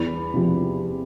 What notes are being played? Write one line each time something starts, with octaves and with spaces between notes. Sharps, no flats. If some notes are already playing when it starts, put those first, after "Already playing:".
Already playing: E2 B5
C3 F3